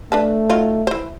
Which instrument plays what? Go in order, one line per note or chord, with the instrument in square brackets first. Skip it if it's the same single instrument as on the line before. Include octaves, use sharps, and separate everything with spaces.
[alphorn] A3 [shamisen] D4 B4 A5
[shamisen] D#3 F#3 F4
E3 C5